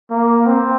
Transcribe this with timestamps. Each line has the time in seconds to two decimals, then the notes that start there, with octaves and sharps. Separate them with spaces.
0.11 A#3
0.47 C4